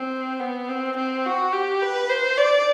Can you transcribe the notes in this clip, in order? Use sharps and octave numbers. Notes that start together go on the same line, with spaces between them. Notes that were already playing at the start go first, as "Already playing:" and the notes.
Already playing: C4
B3
C4
C4
F#4
G4
B4
C5
D5